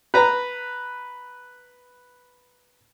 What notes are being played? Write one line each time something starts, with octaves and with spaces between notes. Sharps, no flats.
B4 A#5